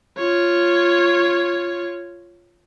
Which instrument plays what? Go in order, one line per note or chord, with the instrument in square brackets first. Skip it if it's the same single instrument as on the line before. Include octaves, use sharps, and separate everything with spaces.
[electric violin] F4 C#5